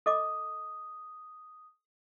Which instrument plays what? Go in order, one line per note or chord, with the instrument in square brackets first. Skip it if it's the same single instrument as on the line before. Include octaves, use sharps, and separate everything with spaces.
[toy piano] A4 D#5 D6 [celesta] D#6